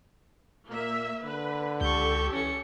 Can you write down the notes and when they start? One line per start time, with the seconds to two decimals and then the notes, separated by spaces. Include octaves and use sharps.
0.69 A#2 A#3 E5
1.24 D3 B4
1.81 C#2 G4 A4 C#6 G6
2.33 E3 C#4 C#7